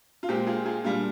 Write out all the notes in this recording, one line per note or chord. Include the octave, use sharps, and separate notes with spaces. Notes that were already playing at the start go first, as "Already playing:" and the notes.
F4
A#2 G#3 C4 G4
F4 G#4
F4 G#4
A#2 G3 D4 F4